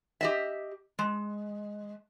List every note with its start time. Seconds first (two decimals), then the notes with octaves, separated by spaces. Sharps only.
0.21 G4 D#5 E5
0.99 G#3